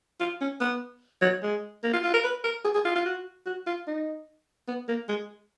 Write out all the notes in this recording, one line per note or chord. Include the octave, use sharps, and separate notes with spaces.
F4
C#4
B3
F#3
G#3
A#3
F4
F4
A#4
B4
A#4
G#4
G#4
F4
F4
F#4
F#4
F4
D#4
B3
A#3
G#3